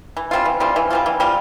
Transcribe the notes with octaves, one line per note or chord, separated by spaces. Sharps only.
E3
G3 C4 F4
E3
G3 C4 F4
E3
G3 C4 F4
E3
G3 C4 F4